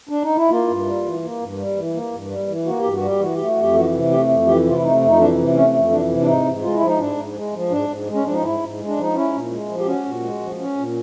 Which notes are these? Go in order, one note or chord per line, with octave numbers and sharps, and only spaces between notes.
D4
D#4
E4
A#3 F4
G2
G3
E3
A#3
G2
G3
E3
A#3
G2
G3
E3
A#3 F#4
G2 G4
F#4
G3 G4
E3 F#4
A3 G4
F#4
F2
G4
E3 F#4
C3
A3 G4
F2
E3 G4
C3 F4
E4
A3 D#4
F2
D#4
E3 D4
C3
A3 C#4
F2
E3 D4
C3
D4
G#2 D#4
G#2
G#3 F4
E4
F3
D#4
G#2 D4
G#2
G#3
F3
G#2 D4
G#2
G#3
C#4
F3 D4
D#4
G#2 E4
G#2
G#3
D4
F3 D#4
C#4 E4
A#2
G#3
F3
G4
C#4 F#4
A#2
G#3
F3
C#4
A#2